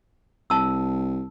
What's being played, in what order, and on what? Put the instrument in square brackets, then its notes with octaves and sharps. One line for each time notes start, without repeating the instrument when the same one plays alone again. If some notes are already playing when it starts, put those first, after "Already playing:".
[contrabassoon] C2 [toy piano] A5 E6